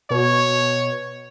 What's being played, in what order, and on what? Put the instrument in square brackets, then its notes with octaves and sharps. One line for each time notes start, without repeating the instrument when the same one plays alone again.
[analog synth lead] B2 [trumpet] C#5